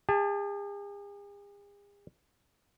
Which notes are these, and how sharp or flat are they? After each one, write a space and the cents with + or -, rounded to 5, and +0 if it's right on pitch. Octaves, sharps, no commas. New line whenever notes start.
G#4 -45 A5 +0